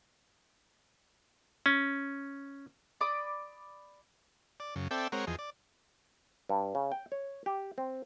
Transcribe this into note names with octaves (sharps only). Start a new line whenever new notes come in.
C#4
D5 B5 D6 D#6
D5
F#2 C#3
C4 A4 D5 E5 G5
G#3 C4 A#4 C#5 F#5
E2 F3 G#4 D#5
D5
G2
C#3
G5
C#5
G4
C4